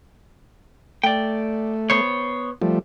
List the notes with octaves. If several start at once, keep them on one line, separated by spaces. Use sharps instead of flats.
A3 D5 G5
B3 C5 C#5
F3 G3 A3